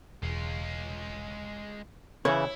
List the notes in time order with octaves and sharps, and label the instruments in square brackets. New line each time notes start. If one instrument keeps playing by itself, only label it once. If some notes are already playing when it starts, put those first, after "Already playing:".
[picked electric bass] E1 [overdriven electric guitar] G#3 F4
[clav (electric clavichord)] C#3 E3 [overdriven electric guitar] E4 [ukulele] C#5